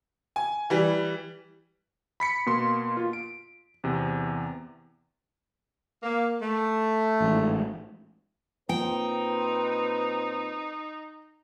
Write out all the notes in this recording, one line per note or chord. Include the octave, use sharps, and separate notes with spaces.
G#5
E3 G3
B5 B6 C#7
B2 A#3 C6
F4
D7
E2 C3
A#3
A3
A1 G#2
A#2 C4 D#4 B4 G5